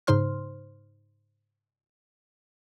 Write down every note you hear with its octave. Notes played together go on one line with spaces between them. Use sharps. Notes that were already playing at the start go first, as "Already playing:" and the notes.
G#2 C#3 D#4 C5 C6 F6